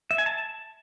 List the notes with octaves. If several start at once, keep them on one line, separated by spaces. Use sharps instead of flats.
E5
G#5
A5